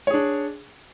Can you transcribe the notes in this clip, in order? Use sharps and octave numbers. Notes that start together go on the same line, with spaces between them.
D4 G#4 C#5